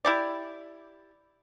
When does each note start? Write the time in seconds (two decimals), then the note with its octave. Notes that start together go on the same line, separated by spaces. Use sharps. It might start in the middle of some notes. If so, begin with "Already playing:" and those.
0.05 E4 G4 D5